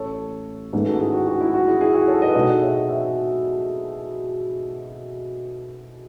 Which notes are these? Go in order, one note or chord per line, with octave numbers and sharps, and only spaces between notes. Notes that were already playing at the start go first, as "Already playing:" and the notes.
Already playing: A1 A4 C#5
G#2 D#3 A3 C#4 G#4 B4
F#4 A4
E4 G#4
F#4
F#4
E4
F#4
E4 G#4
E4 G#4
F#4
A4 C#5
B4 D#5
B2 G#3 D#4 A4 D#5 F#5
D#5 F#5
C#5 E5
D#5 F#5
C#5 E5